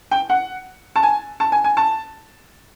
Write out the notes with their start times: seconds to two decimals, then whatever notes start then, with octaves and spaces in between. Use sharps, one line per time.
0.11 G5
0.30 F#5
0.96 A5
1.03 G#5
1.40 A5
1.52 G#5
1.64 G#5
1.77 A5